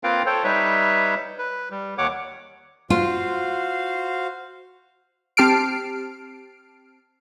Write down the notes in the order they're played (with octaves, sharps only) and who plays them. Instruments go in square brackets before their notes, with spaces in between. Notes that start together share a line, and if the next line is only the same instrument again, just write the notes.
[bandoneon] A#3 C4 F4 B4 F5 G5
A4 C5 C#5 G5
G3 D#4 B4 C#5 E5
B4
G3
D#2 C#5 F#5 D6
[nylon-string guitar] F4 [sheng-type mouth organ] F#4 C5 F5
[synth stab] C4 G4 A5 F6 C7 D7